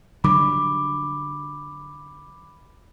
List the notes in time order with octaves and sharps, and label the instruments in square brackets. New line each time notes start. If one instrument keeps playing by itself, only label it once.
[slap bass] D3 F#3 G3 [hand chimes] B5 D6